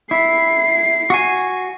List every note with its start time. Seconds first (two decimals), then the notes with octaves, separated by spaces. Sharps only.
0.11 E4 C7
1.10 F#4 G#5